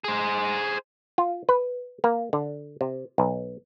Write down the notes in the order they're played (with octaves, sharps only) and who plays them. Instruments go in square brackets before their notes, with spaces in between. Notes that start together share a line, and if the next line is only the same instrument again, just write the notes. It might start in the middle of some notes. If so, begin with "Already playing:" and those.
[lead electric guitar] G#4 C5
[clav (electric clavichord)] F4
B4
A#3
D3
C3
B1